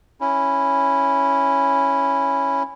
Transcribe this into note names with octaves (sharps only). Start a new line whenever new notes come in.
C#4 E4